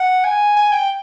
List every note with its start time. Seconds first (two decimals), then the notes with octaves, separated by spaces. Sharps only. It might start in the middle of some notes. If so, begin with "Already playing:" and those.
Already playing: F#5
0.24 G#5
0.56 G#5
0.72 G5